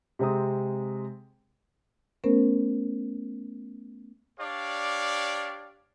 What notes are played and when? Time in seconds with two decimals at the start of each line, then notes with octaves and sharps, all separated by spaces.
0.19 C3 G#3 C4 A#5 D#6
2.24 A3 B3 C#4 A#4 C5
4.39 D4 G4 C#5 D5 F5